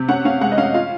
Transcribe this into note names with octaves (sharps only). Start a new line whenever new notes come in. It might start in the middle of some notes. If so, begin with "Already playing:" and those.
Already playing: C3
C#4 F#5
C#4 F5
G#3 F#5
D#5
C#4 F5
F4 F5